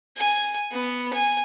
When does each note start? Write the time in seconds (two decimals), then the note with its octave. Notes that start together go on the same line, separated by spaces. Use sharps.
0.17 G#5
0.72 B3
1.13 G#5